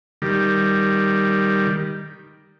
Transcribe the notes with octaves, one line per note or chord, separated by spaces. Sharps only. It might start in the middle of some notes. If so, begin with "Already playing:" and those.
D#3 G3